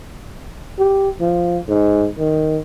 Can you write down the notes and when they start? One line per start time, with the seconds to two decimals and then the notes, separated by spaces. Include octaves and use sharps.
0.79 G4
1.21 F3
1.68 G#2
2.18 D#3